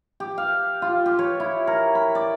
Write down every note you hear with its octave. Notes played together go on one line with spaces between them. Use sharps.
G4
F5
F4
G4
C#5
E4
A#4
B5
D5